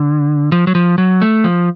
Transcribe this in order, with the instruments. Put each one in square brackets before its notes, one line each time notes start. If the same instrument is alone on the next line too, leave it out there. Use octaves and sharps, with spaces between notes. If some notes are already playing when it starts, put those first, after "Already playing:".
Already playing: [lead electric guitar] D3
F3
F#3
F3
F#3
A3
F3